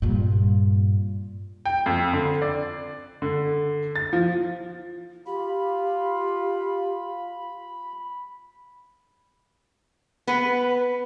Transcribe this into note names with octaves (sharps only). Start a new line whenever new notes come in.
G2 A#2
G5
F2
D3
D5
D3
A6
F3
F4 G4 B5
B3 B4